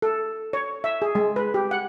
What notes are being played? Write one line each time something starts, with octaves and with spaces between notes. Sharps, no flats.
A4
C#5
E5
G#4
G#3
B4
G4
F#5